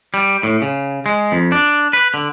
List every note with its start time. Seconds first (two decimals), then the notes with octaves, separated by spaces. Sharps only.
0.14 G3
0.43 A2
0.62 C#3
1.06 G#3
1.32 F2
1.52 D4
1.93 B4
2.14 D3